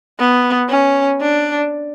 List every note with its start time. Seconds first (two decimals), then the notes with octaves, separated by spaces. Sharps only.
0.19 B3
0.69 C#4
1.20 D4